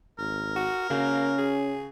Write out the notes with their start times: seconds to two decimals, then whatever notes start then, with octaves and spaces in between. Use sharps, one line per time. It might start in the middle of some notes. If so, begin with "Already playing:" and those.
0.19 G#1 A#4
0.56 F#4
0.90 C#3 A#3 C#4 F#4
1.38 G#4